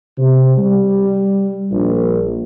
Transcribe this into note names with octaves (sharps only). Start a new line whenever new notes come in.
C3
G3
A#1